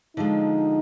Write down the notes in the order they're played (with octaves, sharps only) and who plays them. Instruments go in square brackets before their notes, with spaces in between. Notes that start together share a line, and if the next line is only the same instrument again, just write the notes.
[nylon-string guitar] D3 F3 G#3 [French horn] D#4